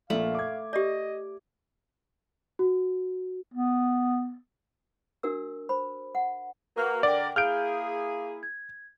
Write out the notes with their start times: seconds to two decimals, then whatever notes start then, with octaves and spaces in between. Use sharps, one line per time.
0.10 A#1 A#2 A3 F5 B5
0.34 D6 G#6
0.73 G4 D5 D#5
2.59 F#4
3.54 B3
5.23 D4 F#4 A#4 E6
5.69 C5 B5
6.15 F#5
6.76 A#3 F#4 A#4 B4 F6
7.03 D3 D4 A#4 D5 F#5 G5
7.36 A#3 E4 G#4 F5 F6 G6 D7
8.43 G#6